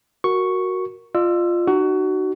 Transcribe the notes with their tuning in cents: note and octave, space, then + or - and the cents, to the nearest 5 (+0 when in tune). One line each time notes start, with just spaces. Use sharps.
F#4 +0 A#4 +0 C#6 +0
F4 +0 D#5 -45 E6 +20
D#4 -35 F#4 +20